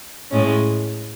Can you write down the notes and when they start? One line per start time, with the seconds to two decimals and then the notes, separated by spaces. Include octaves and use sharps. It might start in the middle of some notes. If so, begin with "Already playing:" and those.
0.31 A2 G#3 C#4